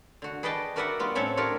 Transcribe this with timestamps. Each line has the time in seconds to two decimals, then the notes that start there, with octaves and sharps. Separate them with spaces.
0.22 D3 F#4
0.43 G#4 B4 D5 D#5 G5 A5
0.76 F#4 A#4 B4 D5 E5 F#5
1.00 G3 B3 F4
1.15 A2 C4 C#4 A4 C#5 E5
1.37 D4 F4 G4 A#4 C#5